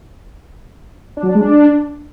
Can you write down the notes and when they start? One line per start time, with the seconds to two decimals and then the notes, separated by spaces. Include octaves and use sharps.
1.17 D4
1.23 F#3
1.29 D4
1.35 G#3
1.41 D4